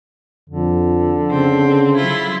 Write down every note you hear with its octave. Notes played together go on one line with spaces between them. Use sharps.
F2 D3
C#3 C4
F#3 E4 F4